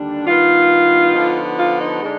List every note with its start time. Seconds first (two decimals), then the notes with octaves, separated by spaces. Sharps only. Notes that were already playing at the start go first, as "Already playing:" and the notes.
Already playing: D#2 D3 G3 D4
0.26 G2 D#3 B3 D#4 F4
1.15 D3 F3 B3 D#4
1.58 F4
1.80 D#4
2.02 D3 G#3 D4